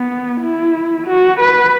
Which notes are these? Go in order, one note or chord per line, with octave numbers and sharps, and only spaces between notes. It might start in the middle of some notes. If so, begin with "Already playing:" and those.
Already playing: B3
E4
F#4
B4